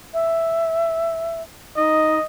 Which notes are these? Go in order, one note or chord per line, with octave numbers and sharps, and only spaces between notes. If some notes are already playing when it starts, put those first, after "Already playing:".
E5
D#4 D#5